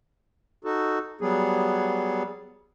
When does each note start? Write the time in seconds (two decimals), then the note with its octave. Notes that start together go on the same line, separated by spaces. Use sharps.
0.64 D#4 F#4 A4
1.21 F#3 G3 B3 G#4